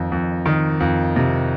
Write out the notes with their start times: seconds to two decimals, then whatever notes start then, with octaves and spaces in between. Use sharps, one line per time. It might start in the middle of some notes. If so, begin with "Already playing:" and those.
Already playing: F2 D#3
0.12 F2
0.46 D#3
0.80 F2
1.16 C3